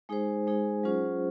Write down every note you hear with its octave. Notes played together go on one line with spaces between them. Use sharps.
G#3 D#4 G#4 C5
G#3 D#4 G#4 C5
F#3 C#4 F4 G#4 C5